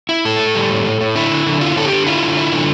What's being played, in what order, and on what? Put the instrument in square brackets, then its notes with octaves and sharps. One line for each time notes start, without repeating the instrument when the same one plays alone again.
[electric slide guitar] E4
A2 A4
A2
G3
A2
A2
A2
D3 E4
D3
D3
E4 F4
D3 A4
G4
D3
E4 F4
D3
E4
D3